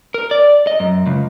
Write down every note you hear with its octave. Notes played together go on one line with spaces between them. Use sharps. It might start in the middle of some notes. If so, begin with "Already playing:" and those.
A#4
D5
D#5
F#2
C#2